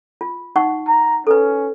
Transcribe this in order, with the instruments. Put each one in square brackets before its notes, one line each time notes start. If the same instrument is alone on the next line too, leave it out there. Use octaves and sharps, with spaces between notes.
[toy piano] F4
D#4 F#5 C#6
[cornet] A#5
[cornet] C#4 [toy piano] A4 B4